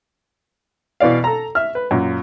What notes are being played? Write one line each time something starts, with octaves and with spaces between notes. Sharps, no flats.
B2 E3 D5 F5
A4 A#5
E5 F6
B4
F#2 A#2